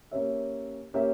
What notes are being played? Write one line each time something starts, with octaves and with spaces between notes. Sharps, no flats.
A#3 C#4 G4 C#5 E5
A#3 C#4 G4 C#5 E5